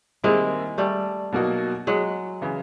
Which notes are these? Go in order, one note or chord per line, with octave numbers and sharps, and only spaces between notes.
D#3 G3 G#3 A#3 C4 E4
G3 A3
B2 F#3 A#3 D#4 F#4
F#3 G#3
C#3 E3